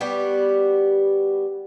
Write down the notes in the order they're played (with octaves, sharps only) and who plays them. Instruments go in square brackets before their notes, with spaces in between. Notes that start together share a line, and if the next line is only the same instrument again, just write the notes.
[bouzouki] G3 B3 F#4 G4